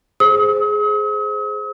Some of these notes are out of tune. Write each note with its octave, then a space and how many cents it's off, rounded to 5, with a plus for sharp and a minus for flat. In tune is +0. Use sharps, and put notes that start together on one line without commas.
G#4 +10 C5 +0 D#6 +45